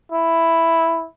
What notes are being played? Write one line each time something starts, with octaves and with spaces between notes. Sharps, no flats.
E4